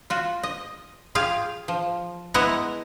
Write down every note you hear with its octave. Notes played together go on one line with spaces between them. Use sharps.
F4 F#4
D#5
F4 G4 G#4 F5
F3
G#3 B3 E4 D#5 F#5 A#5